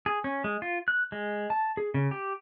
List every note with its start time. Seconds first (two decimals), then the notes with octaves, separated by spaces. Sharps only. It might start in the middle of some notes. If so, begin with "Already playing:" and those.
0.06 G#4
0.24 C#4
0.44 G#3
0.62 F4
0.88 F#6
1.12 G#3
1.50 A5
1.77 G#4
1.94 C#3
2.11 G4